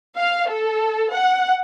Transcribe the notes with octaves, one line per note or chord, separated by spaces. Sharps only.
F5
A4
F#5